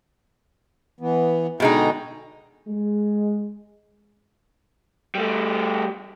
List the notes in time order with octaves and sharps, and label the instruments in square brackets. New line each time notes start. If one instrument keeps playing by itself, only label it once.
[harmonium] E3 B3
[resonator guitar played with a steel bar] B2 G#3 D#4 [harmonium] D3 G5 A#5
[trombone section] G#3
[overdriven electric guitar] G3 A3